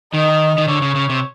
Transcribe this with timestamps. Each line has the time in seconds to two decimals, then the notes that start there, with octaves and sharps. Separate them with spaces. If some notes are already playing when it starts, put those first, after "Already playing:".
0.14 D#3 D#5
0.58 D#3
0.68 D3 C#5
0.82 C#3
0.95 C#3
1.10 C3